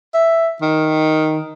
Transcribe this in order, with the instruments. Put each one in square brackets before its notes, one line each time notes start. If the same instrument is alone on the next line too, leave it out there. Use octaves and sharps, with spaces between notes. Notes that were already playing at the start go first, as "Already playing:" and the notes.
[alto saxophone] E5
D#3